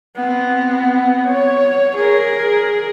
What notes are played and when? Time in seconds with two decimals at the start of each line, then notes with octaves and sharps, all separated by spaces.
0.16 B3 C4
1.25 C#5
1.96 G#4 A#4